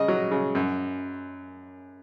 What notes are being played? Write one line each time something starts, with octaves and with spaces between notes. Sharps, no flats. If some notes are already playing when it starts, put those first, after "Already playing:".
Already playing: C#3 D#5 D#6
F#3
C#3
F#2